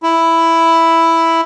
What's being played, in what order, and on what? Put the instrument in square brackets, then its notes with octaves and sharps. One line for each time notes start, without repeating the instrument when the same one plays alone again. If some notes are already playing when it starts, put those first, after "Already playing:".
[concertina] E4